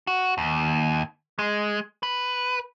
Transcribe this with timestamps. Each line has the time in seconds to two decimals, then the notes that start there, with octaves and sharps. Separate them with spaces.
0.07 F#4
0.38 D#2
1.39 G#3
2.03 B4